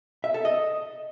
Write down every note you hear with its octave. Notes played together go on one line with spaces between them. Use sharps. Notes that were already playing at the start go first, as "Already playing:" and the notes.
E5
A4
D#5